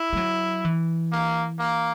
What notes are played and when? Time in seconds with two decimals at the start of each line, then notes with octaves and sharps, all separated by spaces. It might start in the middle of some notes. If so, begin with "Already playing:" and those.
Already playing: E4
0.13 G#3
0.17 F#3
0.65 E3
1.12 A#3
1.59 A#3